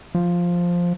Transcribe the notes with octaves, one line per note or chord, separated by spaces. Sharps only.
F3